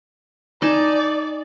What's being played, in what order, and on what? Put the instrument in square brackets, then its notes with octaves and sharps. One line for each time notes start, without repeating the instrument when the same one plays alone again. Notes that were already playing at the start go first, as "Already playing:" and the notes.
[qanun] D#4 G#5 A5 [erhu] D5